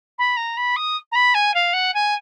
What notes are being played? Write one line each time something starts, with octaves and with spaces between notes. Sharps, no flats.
B5
A#5
B5
D#6
A#5
B5
G#5
F5
F#5
G#5